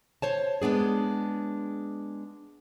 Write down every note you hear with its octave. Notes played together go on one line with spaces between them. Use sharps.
C5 C#5 A5
G#3 B3 D4 G#4